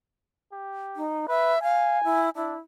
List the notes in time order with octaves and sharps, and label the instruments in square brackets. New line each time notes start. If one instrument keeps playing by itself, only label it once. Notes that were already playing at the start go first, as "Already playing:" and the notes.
[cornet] G4
[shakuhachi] D#4
[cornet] B4 [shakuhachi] E5
[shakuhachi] F5 [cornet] G#5
[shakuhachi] E4
[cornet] D4 [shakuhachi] E4